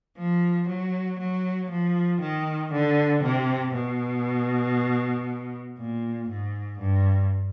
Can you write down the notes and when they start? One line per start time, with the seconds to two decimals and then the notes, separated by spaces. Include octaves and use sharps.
0.18 F3
0.69 F#3
1.20 F#3
1.71 F3
2.21 D#3
2.73 D3
3.23 C3
3.74 B2
5.79 A#2
6.29 G#2
6.79 G2